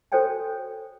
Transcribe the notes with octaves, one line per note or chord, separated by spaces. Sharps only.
F#4 A4 C5 C#5 G5 G#5